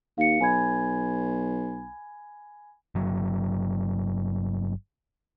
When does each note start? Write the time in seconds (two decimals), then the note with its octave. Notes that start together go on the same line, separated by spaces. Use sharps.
0.18 D#2 F5 C#7
0.41 B1 G#5 B5 G#6
2.95 G1 F#3